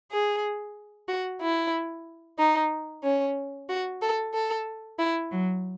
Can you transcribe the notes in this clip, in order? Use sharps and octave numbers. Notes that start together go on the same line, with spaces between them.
G#4
F#4
E4
D#4
C#4
F#4
A4
A4
E4
F#3